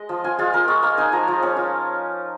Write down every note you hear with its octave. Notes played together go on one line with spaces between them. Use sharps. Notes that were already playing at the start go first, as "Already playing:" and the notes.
Already playing: G#3 D#5
F3
F4 G#5
G#3 F4
F4 A#4
G#3 C#6
A#3 F5
D#4 G#5
F3 A#5
F3
C#4
F4